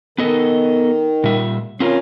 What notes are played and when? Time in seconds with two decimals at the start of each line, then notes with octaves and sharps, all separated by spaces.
0.18 D#3 B3 A4 D#5
1.24 A#2 G3 E5
1.80 C4 C#4 F4 A#4